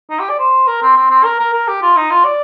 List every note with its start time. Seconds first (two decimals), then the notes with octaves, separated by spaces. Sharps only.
0.10 D#4
0.19 G4
0.30 D5
0.39 C5
0.67 A#4
0.82 C4
0.97 C4
1.10 C4
1.25 A#4
1.39 A#4
1.53 A#4
1.68 G4
1.82 F4
1.97 D#4
2.10 F4
2.25 D5